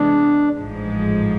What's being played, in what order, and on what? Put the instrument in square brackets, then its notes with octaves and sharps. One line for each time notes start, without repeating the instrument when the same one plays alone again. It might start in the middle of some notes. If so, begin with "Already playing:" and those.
Already playing: [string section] C3 E3 G#3 B3 [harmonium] D4
[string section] A1 G#2 F3 G#3